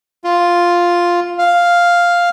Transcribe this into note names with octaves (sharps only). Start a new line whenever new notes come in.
F4
F5